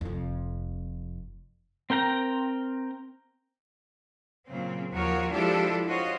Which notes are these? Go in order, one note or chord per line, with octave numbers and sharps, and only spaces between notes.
F1 F2
C4 A#4 G5 A#5
A#2 C#3 F#3 C4
D#2 F3 F#4 A#4 C#5
F3 G#3 D4 E4 G4 A4
F4 F#4 C5 C#5 D#5